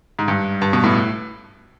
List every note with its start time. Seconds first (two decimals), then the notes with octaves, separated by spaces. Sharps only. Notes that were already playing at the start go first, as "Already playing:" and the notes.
0.19 G#2
0.28 G2
0.62 G2
0.73 B2
0.84 A2